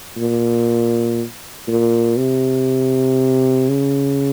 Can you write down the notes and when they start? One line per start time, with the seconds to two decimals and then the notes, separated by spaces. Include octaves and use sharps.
0.17 A#2
1.68 A#2
2.18 C3
3.69 C#3